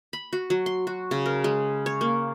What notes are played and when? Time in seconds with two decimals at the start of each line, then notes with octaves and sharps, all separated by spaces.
0.13 B5
0.33 F#4
0.50 F#3
0.66 C6
0.87 F#4
1.11 C#3
1.26 A#4
1.44 G#3
1.86 C#5
2.01 A#3